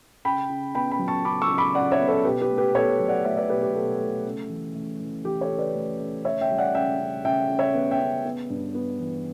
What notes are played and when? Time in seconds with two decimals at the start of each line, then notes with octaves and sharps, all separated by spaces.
0.25 C#3 G5 B5
0.50 C#3
0.75 B3 G5 B5
0.91 G5 B5
0.99 F#3
1.08 A5 C#6
1.25 C#3 B5 D6
1.42 C#6 E6
1.50 C#3
1.58 B5 D6
1.75 C#3 D5 F#5
1.91 C#5 E5
2.00 B3
2.08 A4 C#5
2.25 B2 G4 B4
2.42 G4 B4
2.50 A3
2.58 G4 B4
2.75 B2 A4 C#5
3.00 F#3
3.08 D5 F#5
3.24 A3 C#5 E5
3.37 B4 D5
3.49 B2 G4 B4
3.62 G4
3.74 B2 A4
4.00 A3 A4
4.25 C#3
4.49 E3
4.75 A3
5.00 E3
5.25 E3 G4
5.41 A4 C#5
5.50 C#3
5.58 B4 D5
5.75 A3
6.00 A3
6.25 C#3 C#5 E5
6.41 E5 G5
6.50 G3
6.58 D5 F#5
6.75 C#3 E5 G5
7.00 C#3
7.25 C#3 E5 G5
7.50 C#3
7.59 C#5 E5
7.75 B3
7.91 E5 G5
8.00 C#3
8.25 B3
8.50 G2
8.75 B3
9.00 E3